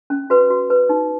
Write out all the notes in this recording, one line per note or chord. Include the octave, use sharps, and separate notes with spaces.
C#4
F#4 B4
F#4
B4
D#4